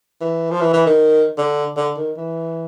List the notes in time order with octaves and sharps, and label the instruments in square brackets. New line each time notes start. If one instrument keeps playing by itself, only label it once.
[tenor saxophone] E3
F3
E3
E3
D#3
D3
D3
D#3
E3